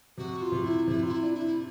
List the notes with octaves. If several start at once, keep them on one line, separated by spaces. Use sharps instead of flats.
C3 F#4
F4
C3
E4
C3 E4
F4
E4
D4
E4